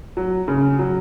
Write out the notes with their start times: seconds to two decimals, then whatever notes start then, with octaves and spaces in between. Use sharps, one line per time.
0.17 F#3
0.48 C#3
0.79 F#3